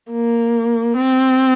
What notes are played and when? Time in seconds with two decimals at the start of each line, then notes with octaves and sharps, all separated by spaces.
0.11 A#3
0.97 C4